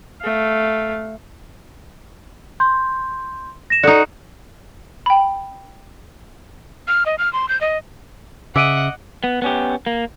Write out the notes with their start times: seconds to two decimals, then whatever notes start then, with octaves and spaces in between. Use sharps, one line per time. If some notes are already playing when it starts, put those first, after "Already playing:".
0.22 A3 F5
2.60 C6 G6
3.70 A#6 E7
3.83 D#4 F#4 A4 D5
5.06 G5 B5
6.88 F6
7.06 D#5
7.18 F6
7.33 C6
7.49 G6
7.61 D#5
8.56 C#3 D#5 E5 F#5 D6 D7 D#7
9.24 B3
9.42 B3 C#4 G4
9.86 A#3